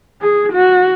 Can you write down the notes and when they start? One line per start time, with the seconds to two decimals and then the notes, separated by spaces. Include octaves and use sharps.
0.22 G#4
0.52 F#4